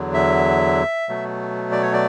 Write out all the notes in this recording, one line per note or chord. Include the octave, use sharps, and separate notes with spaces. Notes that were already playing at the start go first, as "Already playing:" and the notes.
Already playing: E2 D3 F#3
E5
B2 F#3 A3
D5
C#5
D5